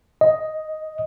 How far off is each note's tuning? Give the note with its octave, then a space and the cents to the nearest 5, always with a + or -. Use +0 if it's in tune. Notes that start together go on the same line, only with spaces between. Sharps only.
D#5 +5